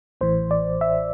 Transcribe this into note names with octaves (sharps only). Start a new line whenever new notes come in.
A1 A2 E3 C5
D5
E5